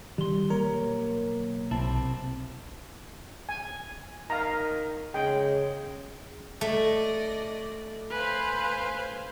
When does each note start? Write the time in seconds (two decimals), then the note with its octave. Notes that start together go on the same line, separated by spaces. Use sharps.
0.18 D#3 G3 C6
0.50 B1 A#3 A#4 C#5
1.71 B1 C3 C4 E4 A5
3.49 G#5
4.30 D#3 F5 A#5
5.14 C#3 G#3 G5
6.61 A3 D5 D#5 A#6
8.11 B4 C5 F5 G#5